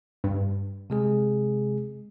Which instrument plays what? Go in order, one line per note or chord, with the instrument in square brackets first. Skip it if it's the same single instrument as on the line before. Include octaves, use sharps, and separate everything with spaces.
[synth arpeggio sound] G2
[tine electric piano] C3 G#3 G#4